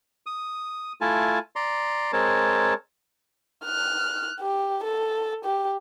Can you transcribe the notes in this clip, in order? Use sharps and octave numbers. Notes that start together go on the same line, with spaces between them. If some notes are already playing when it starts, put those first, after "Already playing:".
D#6
A3 E4 F4 G#5 A5
D5 A#5 C6
G#3 C4 A#4 C#5 A5
F6 F#6
G4
A4
G4